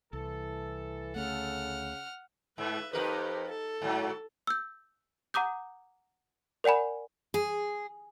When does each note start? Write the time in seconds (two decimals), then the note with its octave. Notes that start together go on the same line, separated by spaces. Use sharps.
0.13 C2 E3 A4
1.16 D2 C#3 A3 F#5 F6
2.58 G#2 B4 E5
2.93 F2 D#4 G4 A#4 B4
3.46 A4
3.82 G#2 F#3
4.47 E6 G6
5.34 F#5 A#5 D6 D#6 G6
6.64 A#4 D5 F#5 G#5 B5
7.34 G#4